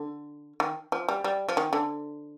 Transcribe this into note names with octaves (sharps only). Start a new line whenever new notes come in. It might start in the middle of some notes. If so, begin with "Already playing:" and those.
Already playing: D3
D#3
F3
G3
G3
F3
D#3
D3